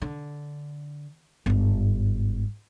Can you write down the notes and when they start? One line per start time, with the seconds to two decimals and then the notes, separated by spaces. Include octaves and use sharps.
0.02 D3
1.46 G1 G#2